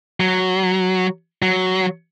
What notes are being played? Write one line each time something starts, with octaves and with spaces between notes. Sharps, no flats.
F#3
F#3